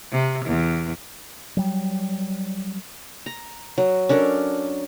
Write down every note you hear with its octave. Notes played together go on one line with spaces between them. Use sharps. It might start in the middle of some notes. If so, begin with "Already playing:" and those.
C3
E2
F#3 G3
A#5
F#3
C#4 D4 A4 A#4